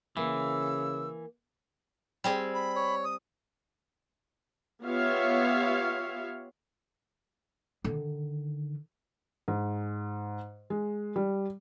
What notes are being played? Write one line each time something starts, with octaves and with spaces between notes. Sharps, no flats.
C#3 E3 A#3 E6
G3 C4 G#4
B5
C#5
D#6
B3 F4 G4 C#5 E5 F5
D3 D#3
G#2
G#3
G3